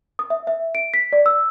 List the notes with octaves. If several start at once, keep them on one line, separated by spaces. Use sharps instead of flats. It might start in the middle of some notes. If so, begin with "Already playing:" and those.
D#6
E5
E5
D7
B6
D5
E6